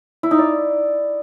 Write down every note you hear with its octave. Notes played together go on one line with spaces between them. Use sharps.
E4
D#4
D5